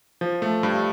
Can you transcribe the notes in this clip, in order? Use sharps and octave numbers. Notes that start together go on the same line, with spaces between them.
F3
A3
G2